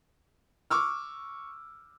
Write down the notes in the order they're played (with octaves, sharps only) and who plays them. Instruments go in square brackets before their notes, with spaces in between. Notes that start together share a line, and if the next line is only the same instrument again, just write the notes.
[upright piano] C#6 D6 E6 F6